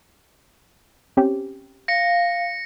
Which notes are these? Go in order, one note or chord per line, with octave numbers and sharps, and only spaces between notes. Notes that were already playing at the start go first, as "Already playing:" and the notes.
C4 C#4 G4
F5 A#6 C#7